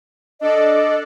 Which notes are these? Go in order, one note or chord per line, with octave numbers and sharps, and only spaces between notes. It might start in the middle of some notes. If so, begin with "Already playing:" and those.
D4 A4 D5 D#5